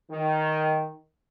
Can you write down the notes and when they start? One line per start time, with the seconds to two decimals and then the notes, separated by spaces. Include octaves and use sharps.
0.10 D#3